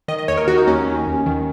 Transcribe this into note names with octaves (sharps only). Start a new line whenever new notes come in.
D#3 D#5
D#5
D#2 C#5
A#4
D#3 F#4
D#4
D#2 C#4
D#3
D#2
D#3